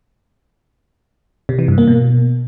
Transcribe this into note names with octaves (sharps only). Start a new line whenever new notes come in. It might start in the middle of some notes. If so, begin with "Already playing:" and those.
C3
E3
G2
A#3
B2